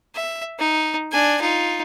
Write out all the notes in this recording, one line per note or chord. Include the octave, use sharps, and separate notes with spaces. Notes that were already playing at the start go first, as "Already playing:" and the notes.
E5
D#4
D4 G#5
D#4 F4